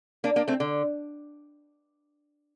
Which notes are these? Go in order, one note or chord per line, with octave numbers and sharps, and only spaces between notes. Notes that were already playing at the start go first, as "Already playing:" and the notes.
A#3 D4
A#3 D4
A3 C4
D3